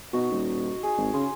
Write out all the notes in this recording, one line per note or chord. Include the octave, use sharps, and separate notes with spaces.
B2 D#4 F#4
D#1
G#4
G#1
C#3 C6